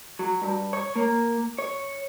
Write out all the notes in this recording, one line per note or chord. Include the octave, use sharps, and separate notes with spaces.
F#3
G2
C#5
A#3
C#5